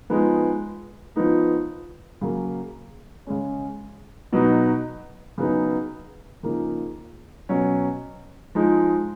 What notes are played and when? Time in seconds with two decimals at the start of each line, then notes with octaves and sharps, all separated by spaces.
0.10 F3 G#3 B3 D#4
1.16 F3 B3 D#4
2.21 C#3 F#3 A#3
3.27 C#3 G#3 C#4
4.33 B2 F#3 B3 D#4
5.38 C#3 F#3 B3 D#4
6.43 C#3 F3 A#3 D#4
7.49 B2 F#3 C#4
8.55 F3 G#3 D#4